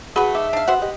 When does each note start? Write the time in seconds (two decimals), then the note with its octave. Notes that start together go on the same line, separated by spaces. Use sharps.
0.16 A3 F#4 G#4 B4 B5
0.35 D#4 E5 D6
0.53 D4 F5
0.68 B3 F#4 C5 F#5
0.82 G4 D#5